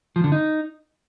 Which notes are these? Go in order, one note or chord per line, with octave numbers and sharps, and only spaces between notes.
F3
D3
D#4